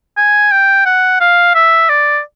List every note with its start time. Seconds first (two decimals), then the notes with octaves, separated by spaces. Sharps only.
0.17 G#5
0.51 G5
0.86 F#5
1.20 F5
1.55 E5
1.89 D5